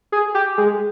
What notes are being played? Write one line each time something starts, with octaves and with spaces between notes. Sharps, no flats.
G#4
G4
G#3